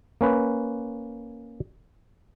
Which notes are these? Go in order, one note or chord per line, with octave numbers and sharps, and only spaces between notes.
A#3 C#4 B4